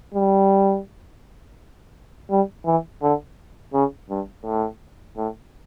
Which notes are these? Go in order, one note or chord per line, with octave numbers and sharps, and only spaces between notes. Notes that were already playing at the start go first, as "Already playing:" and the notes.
G3
G3
E3
D3
C#3
G2
A2
A2